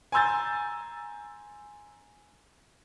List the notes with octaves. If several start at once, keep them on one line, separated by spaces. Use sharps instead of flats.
G#5 A#5 C6 E6 G6 A6